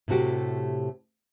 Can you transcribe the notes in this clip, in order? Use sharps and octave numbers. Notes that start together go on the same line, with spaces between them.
A2 C3 A3 F#4 G4